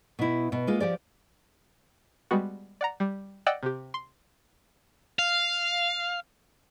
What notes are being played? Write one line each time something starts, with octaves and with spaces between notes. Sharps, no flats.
B2 E4
B2
G#3 A#3 F4
F3 G4 D5
G3 G#3 B3 F#4
D5 F#5 A#5
G3
D5 D#5 F#5 G5 E6
C3 G4
C6
F5